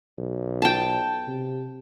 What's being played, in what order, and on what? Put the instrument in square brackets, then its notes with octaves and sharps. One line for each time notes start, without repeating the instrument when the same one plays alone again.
[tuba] B1
[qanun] G5 A5
[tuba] C3